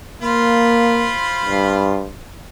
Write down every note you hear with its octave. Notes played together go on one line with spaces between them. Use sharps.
A#3 F4 C5 B5
G2